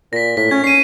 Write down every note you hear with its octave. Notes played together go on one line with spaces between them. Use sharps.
A#2 A#6 B6
A2 B6
C#4 G#6
C#4 C7 D#7